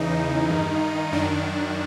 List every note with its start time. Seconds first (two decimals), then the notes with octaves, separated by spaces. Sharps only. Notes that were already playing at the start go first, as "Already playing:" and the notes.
Already playing: E2 C#3 E3 D#4
0.50 G2 D#3
1.12 F#2 D#3 D4